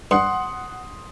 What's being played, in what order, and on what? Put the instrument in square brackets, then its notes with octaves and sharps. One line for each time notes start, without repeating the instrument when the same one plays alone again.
[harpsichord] G2 [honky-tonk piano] F#5 [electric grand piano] C6 [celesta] D#6